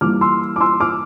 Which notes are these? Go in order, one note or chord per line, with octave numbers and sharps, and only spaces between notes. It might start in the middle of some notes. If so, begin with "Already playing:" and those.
E3 G3 A#3 D6 F6
C6 E6
D6
C6 E6
D6 F6